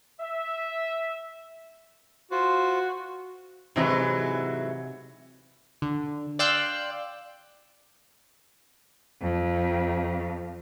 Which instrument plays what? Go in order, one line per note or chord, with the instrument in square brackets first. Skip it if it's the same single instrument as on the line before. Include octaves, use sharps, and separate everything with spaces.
[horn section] E5
[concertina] F4 C5 [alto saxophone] F#4
[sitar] G#2 E3 F#3 [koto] C3 D#4
[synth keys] D3
D5 F5 G5 C6 E6 F#6
[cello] F2